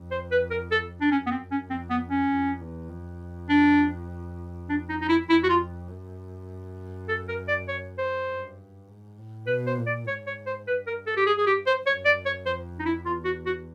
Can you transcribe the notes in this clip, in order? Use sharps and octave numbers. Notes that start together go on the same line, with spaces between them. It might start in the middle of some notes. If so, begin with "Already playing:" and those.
Already playing: F2
C5
B4
A#4
A4
D4
F#2 C#4
B3
C4
C#4
F2 C4
B3
C#4
F2
E2
F2
D4
D4
D#4
D#4
E4
F2 E4
F#4
F4
F#2
A4
A#4
D5
C#5
C5
G2
G#2
A2
B2 B4
C5
A#2
D5
G#2 C#5
C#5
C5
G2 B4
A#4
A4
G4
G#4
G#4
G4
C5
F#2 C#5
D5
C#5
F2 C5
D#4
E4
E2 F4
F#4
F#4